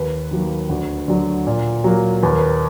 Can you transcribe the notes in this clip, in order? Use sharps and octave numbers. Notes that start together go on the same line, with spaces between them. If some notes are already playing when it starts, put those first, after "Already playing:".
Already playing: D#2 B4
D#3 F#3 A#3
D2
D3 F#3
A#2
F#3 A#3
D#2 B4
A#4
B4